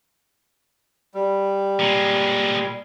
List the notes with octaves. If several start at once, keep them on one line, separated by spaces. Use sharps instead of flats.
G3
A#2 G#3